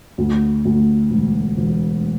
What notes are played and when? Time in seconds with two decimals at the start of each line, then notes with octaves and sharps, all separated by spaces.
0.18 D2
0.65 D2
1.10 E1
1.57 E1